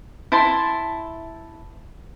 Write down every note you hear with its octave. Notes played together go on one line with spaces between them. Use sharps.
E4 A5 C6